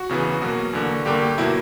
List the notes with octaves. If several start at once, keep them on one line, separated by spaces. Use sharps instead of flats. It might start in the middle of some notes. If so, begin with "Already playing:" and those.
Already playing: F#4
E2 C#3 E3 B3
B2 F#3 A#3 F#4
E2 D3 A#3
G2 D3 A#3 G4
G4
B2 F#3 A#3 E4